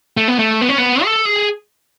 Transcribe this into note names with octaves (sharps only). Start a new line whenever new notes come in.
A3
B3
A3
B3
C#4
B3
A4
G#4